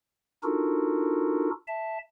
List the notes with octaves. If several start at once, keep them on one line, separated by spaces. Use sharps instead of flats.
D4 D#4 F4 F#4 A4 A#4
E5 A5